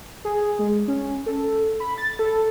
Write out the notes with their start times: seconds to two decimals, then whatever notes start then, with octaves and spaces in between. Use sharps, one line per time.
0.25 G#4
0.59 G#3
0.88 C#4
1.26 A4
1.80 B5
1.98 A6
2.19 A4